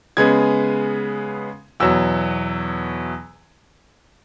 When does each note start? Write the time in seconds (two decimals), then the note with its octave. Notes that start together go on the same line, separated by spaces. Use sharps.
0.17 C#3 G#3 B3 G#6
1.80 E2 B2 F#3 E6